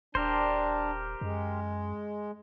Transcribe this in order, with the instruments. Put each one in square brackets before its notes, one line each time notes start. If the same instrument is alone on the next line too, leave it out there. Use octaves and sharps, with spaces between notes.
[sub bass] D#1 [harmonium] D4 [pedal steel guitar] G4 A#4 C5
[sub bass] F#2 [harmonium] G#3